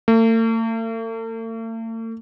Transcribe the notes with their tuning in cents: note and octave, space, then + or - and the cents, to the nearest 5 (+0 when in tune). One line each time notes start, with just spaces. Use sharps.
A3 +45